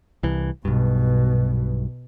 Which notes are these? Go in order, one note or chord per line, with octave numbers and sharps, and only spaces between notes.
C2 E3
B1 G2 B2